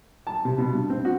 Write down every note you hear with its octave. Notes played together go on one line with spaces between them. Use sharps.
A5
C3
B2
G2
C4
F#4